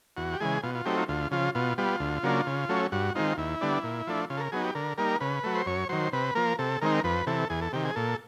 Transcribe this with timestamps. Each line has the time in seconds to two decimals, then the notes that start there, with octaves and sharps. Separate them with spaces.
0.17 E2 F#4
0.33 G4
0.40 C#3 E3 G#3 G#4
0.63 B2 F4
0.75 F4
0.85 F#3 A3 C4 D#4 G4
0.97 F4
1.08 D2 F4
1.31 C#3 F3 F4
1.55 B2 F4
1.78 G3 B3 F4
2.00 D2
2.23 C#3 F#3 A#3 D4
2.47 C#3
2.69 F#3 A3 C#4
2.92 G2 F#4
3.15 D#3 G#3 C4 D#4 F4
3.37 D#2 E4
3.61 D3 G3 B3 D4
3.84 A#2
4.07 F3 A3 D4
4.30 C#3 F4
4.37 A4
4.40 A#4
4.52 F#3 B3 D#4 G#4
4.64 G4
4.75 D3 A#4
4.98 G3 A#3 D#4 A#4
5.20 C#3 B4
5.44 F#3 A3
5.55 C5
5.66 F#2 C#5
5.89 D#3 F#3 C5
6.13 C3 B4
6.35 F3 A#3 A#4
6.59 C3 A4
6.81 D#3 G#3 C4 D#4 A#4
7.04 F2 B4
7.27 C3 E3 A4
7.50 E2 G#4
7.62 A4
7.73 C3 D#3 G4
7.85 G#4
7.96 A#2 A4